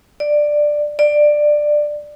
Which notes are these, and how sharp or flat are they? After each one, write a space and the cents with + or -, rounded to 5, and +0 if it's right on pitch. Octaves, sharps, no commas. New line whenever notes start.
D5 +10
D5 +15